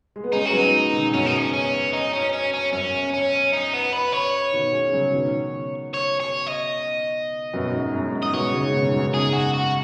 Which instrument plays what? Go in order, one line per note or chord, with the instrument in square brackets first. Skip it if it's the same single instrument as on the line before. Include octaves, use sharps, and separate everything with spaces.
[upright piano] G#3
B3
[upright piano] G#3 C#4 [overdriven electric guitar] D#4
[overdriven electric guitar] F#4
[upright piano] F#3 B3 [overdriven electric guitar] D#4
[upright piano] B2 D#3
[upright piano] F#2 B2 [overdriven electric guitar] C#4
[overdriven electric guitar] D#4
C#4
C#4
D#4
C#4
C#4
C#4
[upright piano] F#2 [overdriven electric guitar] C#4
[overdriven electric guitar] C#4
D#4
B3
B4
C#5
[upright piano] B2 D#3
G#3 C#4
C#3 F#3
B2 D#3
[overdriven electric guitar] C#5
C#5
D#5
[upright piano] F#2 B2
G#2
F#2
G#2
[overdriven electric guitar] D#5
[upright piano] F#2 B2 [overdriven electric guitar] C#5
[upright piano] G#2 C#3
B2 D#3
F#2 B2
[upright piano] G#2 C#3 [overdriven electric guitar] G#4
[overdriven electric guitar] F#4
F#4